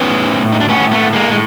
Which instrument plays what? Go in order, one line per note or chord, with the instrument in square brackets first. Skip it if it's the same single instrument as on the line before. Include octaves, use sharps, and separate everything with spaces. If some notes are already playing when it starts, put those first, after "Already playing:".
Already playing: [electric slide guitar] E3 B3 C#4
A2
A2
D#4
D4
A2 B3 C#4
A3 B3
A2
G#3 A#3
A2 G#3